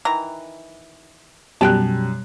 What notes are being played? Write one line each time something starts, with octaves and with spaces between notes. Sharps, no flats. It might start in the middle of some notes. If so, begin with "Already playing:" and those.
D#3 E3 A#5
F#2 B2 G3 G5 A5 F#6